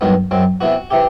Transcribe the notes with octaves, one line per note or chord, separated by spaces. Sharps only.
G2 D#3 F#3 B3
F#2 F#3 C4
C3 E3 B3 F#4
C3 E3 G4